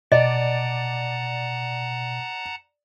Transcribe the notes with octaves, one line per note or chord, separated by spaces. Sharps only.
B2 D5 D#5 F#5 A5 A#5